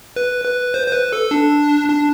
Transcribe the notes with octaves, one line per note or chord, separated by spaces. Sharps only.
B4
B4
C5
C5
B4
A4
D4
D4